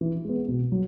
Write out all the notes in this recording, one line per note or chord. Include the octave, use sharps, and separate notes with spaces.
E3
G#3 B3
B2
F#3